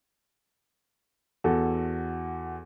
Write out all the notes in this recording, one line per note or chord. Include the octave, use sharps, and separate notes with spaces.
E2 F#4 A4